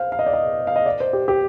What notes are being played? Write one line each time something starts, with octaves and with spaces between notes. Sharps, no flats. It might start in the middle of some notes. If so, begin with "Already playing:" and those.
Already playing: C5 F5
F5
D#5
D5
D#5
F5
D#5
D5
C5
G4
G4